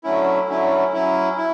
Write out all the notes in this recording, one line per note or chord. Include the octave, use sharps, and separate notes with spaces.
D3 F#3 A3 C#4 E4
D3 F#3 A3 C#4 E4
F#3 C#4 E4
E4